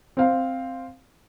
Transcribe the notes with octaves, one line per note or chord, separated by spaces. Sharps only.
C4 F5